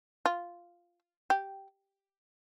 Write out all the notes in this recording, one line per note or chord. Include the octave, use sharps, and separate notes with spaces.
F4
G4